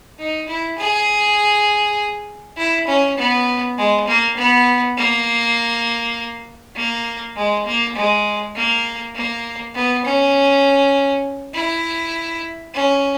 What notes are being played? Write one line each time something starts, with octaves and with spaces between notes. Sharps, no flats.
D#4
E4
G#4
E4
C#4
B3
G#3
A#3
B3
A#3
A#3
G#3
A#3
G#3
A#3
A#3
B3
C#4
E4
C#4